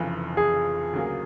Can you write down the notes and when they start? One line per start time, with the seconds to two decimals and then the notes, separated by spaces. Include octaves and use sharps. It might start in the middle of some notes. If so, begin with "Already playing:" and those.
Already playing: F1 F2 C#3 E3
0.37 G#4
0.93 D2 C#3 F#3 A#3